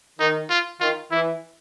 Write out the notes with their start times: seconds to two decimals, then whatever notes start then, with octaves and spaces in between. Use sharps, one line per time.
0.20 D#3 D#4
0.50 F4
0.80 D#3 F4
1.11 E3 E4